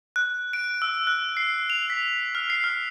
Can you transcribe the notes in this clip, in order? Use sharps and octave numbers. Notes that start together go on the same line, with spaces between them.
F#6
D7
E6
F#6
C7
F7
B6
F6
C7
F6